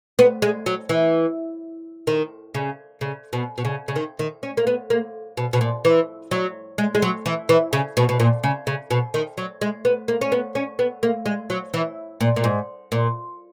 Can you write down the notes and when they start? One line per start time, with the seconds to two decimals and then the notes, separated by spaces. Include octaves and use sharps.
0.19 B3
0.42 G#3
0.66 F#3
0.89 E3
2.07 D#3
2.54 C#3
3.01 C#3
3.33 B2
3.58 B2
3.65 C#3
3.88 C#3
3.96 D#3
4.19 D#3
4.43 C#4
4.57 A#3
4.67 B3
4.90 A#3
5.37 B2
5.53 B2
5.61 A#2
5.85 E3
6.31 F#3
6.78 G#3
6.95 G#3
7.02 F#3
7.26 E3
7.49 E3
7.73 C#3
7.97 B2
8.09 B2
8.20 A#2
8.44 C#3
8.67 C#3
8.90 B2
9.14 D#3
9.37 F#3
9.61 G#3
9.85 B3
10.08 A#3
10.21 C#4
10.32 B3
10.55 C#4
10.79 B3
11.03 A#3
11.26 G#3
11.50 F#3
11.74 E3
12.21 A#2
12.36 A#2
12.44 G#2
12.92 A#2